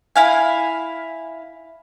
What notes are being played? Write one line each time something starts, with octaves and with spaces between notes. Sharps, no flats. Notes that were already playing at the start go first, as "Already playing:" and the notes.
E4 F5 G#5